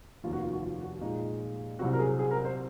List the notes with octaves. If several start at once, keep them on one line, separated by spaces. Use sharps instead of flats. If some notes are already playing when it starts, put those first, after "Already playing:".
F1 D#2 D#3 A#3 F4
F#4
F4
F#4
F4
F#4
A#2 G#3 D#4 F4
F4
C2 C3 F#3 C4 F#4
A#4
G#4
G#4
A#4
C5